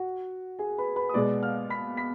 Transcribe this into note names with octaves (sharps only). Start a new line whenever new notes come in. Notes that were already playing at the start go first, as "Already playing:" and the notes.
Already playing: F#4 F#5
G#4 G#5
B4 B5
B4 B5
D#6
B2 G#3 B3 D5 D6
F5 F6
B5 B6
B5 B6